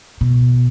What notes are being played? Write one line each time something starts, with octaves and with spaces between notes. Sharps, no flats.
B2